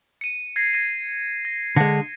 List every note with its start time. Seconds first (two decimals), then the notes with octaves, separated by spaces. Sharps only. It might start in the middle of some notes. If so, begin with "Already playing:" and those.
0.21 C#7 D#7
0.56 G#6 A#6 C7
0.73 G#6 A#6 D#7
1.45 A#6
1.76 D3 G#3 A#6